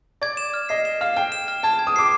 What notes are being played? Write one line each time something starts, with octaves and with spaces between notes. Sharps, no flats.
D5 G#6
E7
F6
D#5 C7
E7
F5 F6
G5 F6
E7
F6
A5 G#6
G#6
D#6
D6 C7